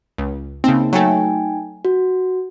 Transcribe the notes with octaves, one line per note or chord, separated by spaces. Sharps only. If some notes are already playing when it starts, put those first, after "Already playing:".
C#2
C#3 A#3 C4 D#4
F#3 A3 D#4 G5 G#5
F#4